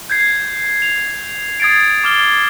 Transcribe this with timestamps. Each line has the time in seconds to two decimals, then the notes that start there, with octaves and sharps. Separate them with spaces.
0.10 G6 G#6 C7
0.82 F7
1.60 D#6 G#6 A6 C7 D7
2.04 D6 F6 G7